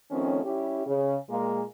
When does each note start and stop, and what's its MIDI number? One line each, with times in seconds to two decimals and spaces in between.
0.11 0.42 51
0.11 0.42 53
0.11 0.42 57
0.11 0.42 60
0.11 0.42 61
0.43 0.81 55
0.43 0.81 61
0.43 0.81 64
0.43 0.81 67
0.86 1.16 49
1.29 1.62 46
1.29 1.62 56
1.29 1.62 58